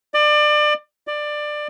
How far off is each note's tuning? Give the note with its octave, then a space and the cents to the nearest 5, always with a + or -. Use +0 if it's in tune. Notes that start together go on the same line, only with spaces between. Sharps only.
D5 +30
D5 +20